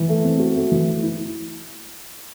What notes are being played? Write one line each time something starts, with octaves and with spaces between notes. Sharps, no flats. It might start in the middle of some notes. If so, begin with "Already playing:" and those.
Already playing: E3
A3
C4
F#4
A3
E3
A3
E4